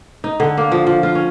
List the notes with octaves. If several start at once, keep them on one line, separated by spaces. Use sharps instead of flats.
D#4
D3
A#3
F3
F3
F4
C#4